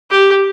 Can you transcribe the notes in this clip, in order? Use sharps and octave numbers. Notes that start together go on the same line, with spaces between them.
G4